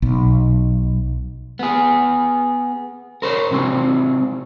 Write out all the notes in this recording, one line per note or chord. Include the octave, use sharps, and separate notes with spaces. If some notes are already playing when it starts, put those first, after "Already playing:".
B1
B3 G#4
A#4 C5 C#5
C3 F#3 C4